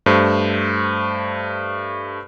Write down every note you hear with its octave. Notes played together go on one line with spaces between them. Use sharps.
G2 A3 C5